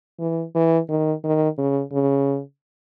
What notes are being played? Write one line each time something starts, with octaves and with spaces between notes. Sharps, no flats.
E3
E3
D#3
D#3
C#3
C#3